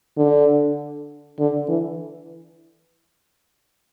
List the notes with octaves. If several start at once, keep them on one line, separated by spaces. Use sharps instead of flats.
D3
D3
E3